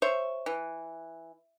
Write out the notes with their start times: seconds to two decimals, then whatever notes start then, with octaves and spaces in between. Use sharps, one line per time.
0.02 C5 C#5 E5
0.46 E3